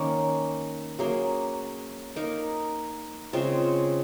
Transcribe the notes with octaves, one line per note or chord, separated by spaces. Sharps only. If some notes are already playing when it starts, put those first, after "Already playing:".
Already playing: D#3 A#3 C#4
F#3 A#3 C#4 G#4
A#3 D#4 A#4
C#3 G#3 C4 F4